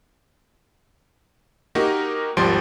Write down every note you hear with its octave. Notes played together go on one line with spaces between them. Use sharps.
A#3 D#4 F#4 G4 A#4
G#1 D#2 F3 G3 C6 D7